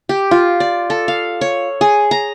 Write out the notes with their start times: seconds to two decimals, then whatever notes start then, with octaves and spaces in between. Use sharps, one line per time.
0.09 G4
0.31 F4
0.60 D5
0.90 A4
1.08 F5
1.41 C#5
1.81 G#4
2.11 A#5